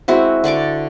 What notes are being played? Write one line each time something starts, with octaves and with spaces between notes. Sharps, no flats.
G#3 C4 E4 F#4
D3 D5 C#6 D6